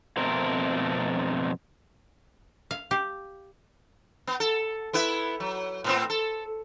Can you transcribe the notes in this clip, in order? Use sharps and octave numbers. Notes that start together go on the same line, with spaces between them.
F2 B2 A3 C4 A#4
F5
G4
B3
A4
B3 E4 B4
F#3
A2 B3 C4
A4